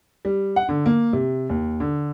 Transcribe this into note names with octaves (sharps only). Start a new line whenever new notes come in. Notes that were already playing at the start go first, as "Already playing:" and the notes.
G3
F#5
D3
A#3
C3
D#2
D3